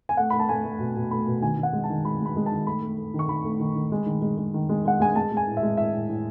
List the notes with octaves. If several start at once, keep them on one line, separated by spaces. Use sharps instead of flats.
G#5
A3 F#5
A3 B5
A5
A3 G#5
A3
B2
B2
A3 B5
B2
D#3 G#5
D#3
F#5
G#3
A5
D#3
G#3 B5
G#3 B5
G#3
A5
D#3
A3 B5
A3
A3
D#3
C#6
D#3 B5
A3
D#3
D#3
G#3
D#3
G#3
G#3
D#3
G#3
G#3 F#5
G#3 G#5
G#3 A5
G#3
G#5
A2
E5
G#3
A2 E5
A2
A2